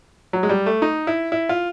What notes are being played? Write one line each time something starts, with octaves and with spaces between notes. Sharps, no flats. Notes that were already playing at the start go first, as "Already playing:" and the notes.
F#3
G#3
G3
A3
D#4
E4
E4
F4